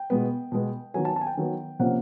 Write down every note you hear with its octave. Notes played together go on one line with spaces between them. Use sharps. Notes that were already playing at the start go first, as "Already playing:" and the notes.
Already playing: G5
B2 G#3 B3
B2 G#3 B3
D#3 F#3 B3 G#5
A5
A5
G#5
G5
D#3 F#3 B3
C3 F3 A#3 C#4 F#5